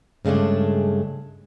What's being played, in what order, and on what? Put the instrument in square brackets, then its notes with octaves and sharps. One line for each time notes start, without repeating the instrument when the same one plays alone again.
[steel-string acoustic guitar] G2 C#3 G#3 A3 D4